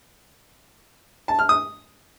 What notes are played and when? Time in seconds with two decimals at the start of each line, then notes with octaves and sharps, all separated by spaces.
1.28 A5
1.39 F6
1.49 D#6